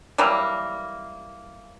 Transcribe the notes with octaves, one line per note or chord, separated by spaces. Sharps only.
E3 F#3 G3 A#3